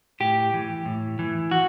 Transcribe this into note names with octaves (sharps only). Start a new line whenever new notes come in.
A2 G4
E3
A2
E3
F#4